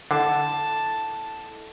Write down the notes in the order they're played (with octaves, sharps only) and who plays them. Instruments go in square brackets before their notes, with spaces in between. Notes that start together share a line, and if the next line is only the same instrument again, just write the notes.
[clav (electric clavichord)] D3 [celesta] E4 A4 D#5 [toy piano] F#5 [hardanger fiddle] A5